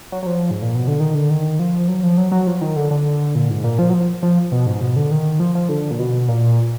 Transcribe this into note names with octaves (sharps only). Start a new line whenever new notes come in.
F#3
F#3
F3
G#2
A#2
B2
D3
D#3
D3
D#3
F3
F#3
F3
F#3
F#3
F3
D#3
D3
D3
A#2
G#2
A#2
F3
F#3
F3
F3
B2
G#2
B2
D3
D#3
F3
F3
D3
A#2
B2
A#2